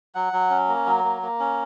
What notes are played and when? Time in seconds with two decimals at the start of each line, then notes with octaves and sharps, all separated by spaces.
0.15 F#3 F#5
0.33 F#3
0.50 C#4
0.68 A#3
0.86 F#3
1.04 A#3
1.22 A#3
1.40 C#4